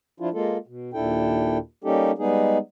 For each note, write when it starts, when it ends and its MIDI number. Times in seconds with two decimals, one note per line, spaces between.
0.20 0.29 53
0.20 0.29 62
0.20 0.29 64
0.20 0.29 65
0.33 0.57 56
0.33 0.57 58
0.33 0.57 65
0.33 0.57 69
0.67 0.90 47
0.94 1.58 39
0.94 1.58 46
0.94 1.58 62
0.94 1.58 64
0.94 1.58 69
0.94 1.58 79
1.84 2.11 55
1.84 2.11 58
1.84 2.11 61
1.84 2.11 63
1.84 2.11 67
1.84 2.11 69
2.18 2.58 55
2.18 2.58 56
2.18 2.58 59
2.18 2.58 63
2.18 2.58 68